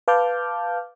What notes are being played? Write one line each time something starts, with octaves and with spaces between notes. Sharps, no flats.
B4 F5 A5 D6 F6 G6